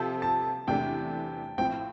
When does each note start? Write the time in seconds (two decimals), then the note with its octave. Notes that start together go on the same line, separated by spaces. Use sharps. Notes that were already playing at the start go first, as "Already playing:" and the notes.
Already playing: C3 F3 C4 A4 A5
0.22 A5
0.67 E2 C3 E3 A3 D4 G5
1.58 A2 F3 C4 G5